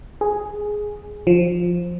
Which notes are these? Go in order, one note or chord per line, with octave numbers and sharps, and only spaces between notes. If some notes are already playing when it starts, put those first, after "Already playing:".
G#4
F3